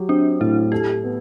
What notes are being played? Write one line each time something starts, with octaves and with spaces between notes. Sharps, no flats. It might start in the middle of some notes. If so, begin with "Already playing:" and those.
Already playing: F#3 G4
C4 D4
A2 E4
G4 A4
B3